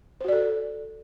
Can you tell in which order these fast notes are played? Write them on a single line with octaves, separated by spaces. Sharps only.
C5 F#4 D5 A4